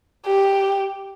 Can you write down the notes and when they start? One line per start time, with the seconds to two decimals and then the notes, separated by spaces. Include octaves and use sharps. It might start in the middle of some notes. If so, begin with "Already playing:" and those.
0.27 G4